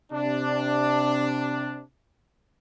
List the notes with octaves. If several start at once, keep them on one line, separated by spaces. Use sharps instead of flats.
C3 D4